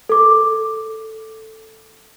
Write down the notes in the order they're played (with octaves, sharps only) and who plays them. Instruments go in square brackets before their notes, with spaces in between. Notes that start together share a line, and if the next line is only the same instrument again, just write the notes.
[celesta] A4 D6